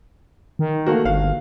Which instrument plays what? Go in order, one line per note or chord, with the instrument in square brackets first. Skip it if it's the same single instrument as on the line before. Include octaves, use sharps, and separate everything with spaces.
[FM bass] D#3
[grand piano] A3 A#3 F#4
[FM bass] G1 [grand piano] F5